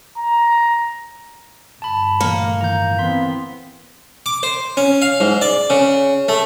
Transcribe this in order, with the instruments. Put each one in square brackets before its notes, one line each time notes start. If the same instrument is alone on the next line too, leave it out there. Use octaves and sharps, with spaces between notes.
[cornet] A#5
[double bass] G1 [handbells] A5 B5
[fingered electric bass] A#2 E3 A3 [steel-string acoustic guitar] A#3 [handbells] C#7
[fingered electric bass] A2 D#3 E3 [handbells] A#5 G6
[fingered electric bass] E3 [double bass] B3 C4 [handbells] C6 B6
[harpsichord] D6
C5
C#4
F5
G#2
D5
C#3
A3